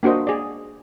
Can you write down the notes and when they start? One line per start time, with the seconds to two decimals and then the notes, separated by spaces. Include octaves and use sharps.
0.03 A#3 D4 F#4 C5 D#5
0.27 G#4 D5